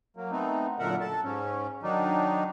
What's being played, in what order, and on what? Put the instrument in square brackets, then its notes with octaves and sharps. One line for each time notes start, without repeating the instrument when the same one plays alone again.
[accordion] F#3 A#3
A3 B3 C4 D#4
F#2 A#2 D3 A#4 E5 F#5
A4 A5
G#2 C#4
D#3 F#3 D4 D#4